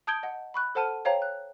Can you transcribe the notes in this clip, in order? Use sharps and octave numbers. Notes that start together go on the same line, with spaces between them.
A5 D#6 G6 G#6 D7 G7
D#5 F#5
B5 C#6 F#6
A4 C5 F#5 A5 F6 D#7
C5 C#5 F5 G5 A#5
F#6